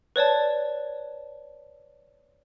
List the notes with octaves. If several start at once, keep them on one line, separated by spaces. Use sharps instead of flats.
B4 C#5 D5 A5